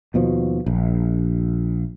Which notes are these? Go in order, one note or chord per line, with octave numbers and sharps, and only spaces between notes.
D#2 B2 F3
A#1